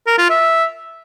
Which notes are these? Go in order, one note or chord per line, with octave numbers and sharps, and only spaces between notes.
A#4
F4
E5